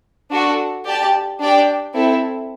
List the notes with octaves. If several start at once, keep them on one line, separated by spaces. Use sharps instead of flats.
D4 F#4 A4
G4 D5 A5
D4 G4 D5 G5
C4 E4 A4